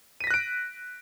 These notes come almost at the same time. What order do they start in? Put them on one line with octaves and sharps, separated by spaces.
D#7 B6 A#6 F#6 D7